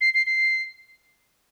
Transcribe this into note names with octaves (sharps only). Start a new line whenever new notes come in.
C7
C7
C7